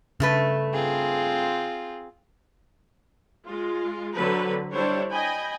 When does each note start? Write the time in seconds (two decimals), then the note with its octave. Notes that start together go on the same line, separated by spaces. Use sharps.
0.20 G2 C#3 A3 B4
0.73 C4 F4 G#4
3.45 G#3 F4
4.14 D3 F#3 C4 A4 B4
4.72 G3 D4 E4 C5 C#5
5.10 D#5 G5 G#5 B5